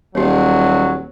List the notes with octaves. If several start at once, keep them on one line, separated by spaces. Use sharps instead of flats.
D#1 F#3 G4 C#5